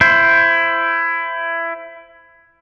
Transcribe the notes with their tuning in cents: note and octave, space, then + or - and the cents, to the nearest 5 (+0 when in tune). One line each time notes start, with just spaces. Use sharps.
E4 +20 C5 +0